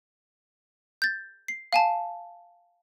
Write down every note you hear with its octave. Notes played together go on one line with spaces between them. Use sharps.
G6 A6
C7
F5 G#5 A5